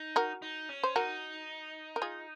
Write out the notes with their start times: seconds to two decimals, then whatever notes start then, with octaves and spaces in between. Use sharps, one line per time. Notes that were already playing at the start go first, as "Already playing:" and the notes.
Already playing: D#4
0.16 F#4 A#4
0.42 D#4
0.69 C#4
0.83 C5
0.96 D#4 F#4 A#4
1.96 A#4
2.02 F4 G#4